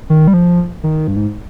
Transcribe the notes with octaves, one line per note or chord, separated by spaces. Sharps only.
D#3
G3
F3
D#3
G2
G#2